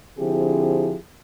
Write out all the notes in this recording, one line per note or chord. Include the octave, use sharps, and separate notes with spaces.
D3 F3 C4 E4 G4 G#4